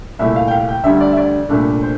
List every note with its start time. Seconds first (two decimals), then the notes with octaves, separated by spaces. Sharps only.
0.19 C2 A#2 A3 E4 E5
0.36 F5
0.48 G5
0.51 F5
0.69 G5
0.84 D2 D3 G3 E5
1.00 D5
1.12 E5
1.17 D5
1.49 C2 A#2 A3 D4
1.82 C5